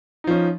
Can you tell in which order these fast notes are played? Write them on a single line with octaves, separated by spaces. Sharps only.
D#4 F3 C#4